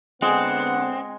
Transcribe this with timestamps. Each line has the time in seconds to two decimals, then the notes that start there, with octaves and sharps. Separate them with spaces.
0.22 D3 G#3 B3 C4 F#5